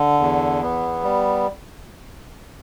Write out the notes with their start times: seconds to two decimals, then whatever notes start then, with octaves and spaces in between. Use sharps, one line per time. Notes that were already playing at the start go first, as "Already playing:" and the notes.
Already playing: D3
0.20 E2
0.62 B3
1.03 G3